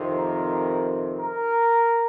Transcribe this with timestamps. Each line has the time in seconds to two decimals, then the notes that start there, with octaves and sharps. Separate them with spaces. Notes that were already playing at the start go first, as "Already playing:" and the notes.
Already playing: F2 C3 D#3
0.15 A#4
1.17 A#4